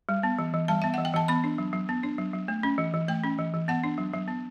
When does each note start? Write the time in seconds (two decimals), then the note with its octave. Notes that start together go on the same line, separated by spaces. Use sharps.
0.09 G3
0.23 B3
0.39 E3
0.54 E3
0.68 G3 A5
0.82 B3 E5
0.94 E3 F#5
1.05 G5
1.14 E3 A5
1.28 B3 B5
1.44 D4
1.58 F#3
1.73 F#3
1.89 B3
2.03 D4
2.18 F#3
2.33 F#3
2.48 A3
2.63 C#4
2.78 E3
2.94 E3
3.08 A3 G5
3.24 C#4
3.38 E3
3.54 E3
3.68 B3 F#5
3.84 D4
3.98 F#3
4.13 F#3
4.28 B3